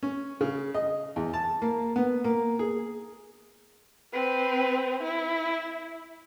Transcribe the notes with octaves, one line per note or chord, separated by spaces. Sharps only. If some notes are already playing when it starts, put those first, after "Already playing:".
C#4
C#3
D#5
E2
A5
A#3
B3
A#3
G#4
C4 B4
E4